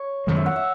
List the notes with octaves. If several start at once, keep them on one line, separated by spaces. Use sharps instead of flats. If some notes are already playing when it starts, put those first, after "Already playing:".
Already playing: C#5
F#2 D#3 G#3
E5
F#5
E5